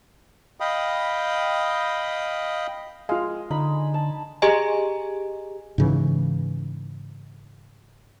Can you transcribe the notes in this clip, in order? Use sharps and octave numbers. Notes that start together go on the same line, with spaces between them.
D#5 F5 G5 B5 D#6
G#3 F4 F5
D3 D#4 B5
A5
G4 G#4 D#5 G#5 A#5
G#2 C#3 E3